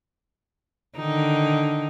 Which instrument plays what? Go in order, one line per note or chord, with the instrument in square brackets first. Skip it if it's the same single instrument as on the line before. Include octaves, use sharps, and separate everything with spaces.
[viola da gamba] D3 D#3 D#4